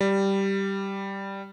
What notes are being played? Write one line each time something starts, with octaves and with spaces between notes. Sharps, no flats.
G3